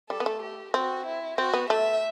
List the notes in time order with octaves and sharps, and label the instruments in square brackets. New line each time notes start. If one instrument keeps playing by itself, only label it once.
[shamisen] G3 [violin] A4
[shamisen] B3
A3
[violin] G4
[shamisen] C4 [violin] F#4
[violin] E4
[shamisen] C4 [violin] F#4
[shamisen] B3
[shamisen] A3 [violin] E5